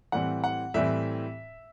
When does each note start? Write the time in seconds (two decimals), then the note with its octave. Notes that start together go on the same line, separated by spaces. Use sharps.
0.12 A2 E3 G3 C4 F#5
0.44 F#5
0.74 A2 E3 G3 C4 E5